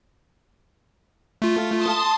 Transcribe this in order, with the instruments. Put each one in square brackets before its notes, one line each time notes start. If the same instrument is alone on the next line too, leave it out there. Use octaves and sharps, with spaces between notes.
[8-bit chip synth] A3 F4
[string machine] A5 C6 D#6